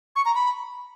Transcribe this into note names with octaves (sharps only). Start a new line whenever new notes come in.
C#6
A#5
B5